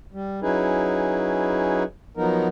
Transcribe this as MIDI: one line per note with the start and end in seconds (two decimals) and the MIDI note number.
0.13 0.40 55
0.42 1.83 54
0.42 1.83 61
0.42 1.83 63
0.42 1.83 64
0.42 1.83 68
0.42 1.83 71
2.17 2.48 53
2.17 2.48 54
2.17 2.48 59
2.17 2.48 63
2.17 2.48 70